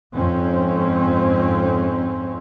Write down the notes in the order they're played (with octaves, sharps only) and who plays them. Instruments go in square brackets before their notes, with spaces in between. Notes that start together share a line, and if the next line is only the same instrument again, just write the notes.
[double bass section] F2 G#2 C4 C#4